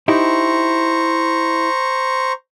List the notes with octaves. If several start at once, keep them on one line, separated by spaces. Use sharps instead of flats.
D#4 E4 G4 C5 A#5 C#6